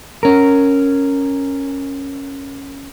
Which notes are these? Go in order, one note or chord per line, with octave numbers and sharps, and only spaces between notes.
C#4 A#4